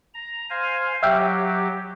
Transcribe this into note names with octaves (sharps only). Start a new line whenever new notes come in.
A#5
C5 F5 G#5
F#3 G4 E5 F5 G5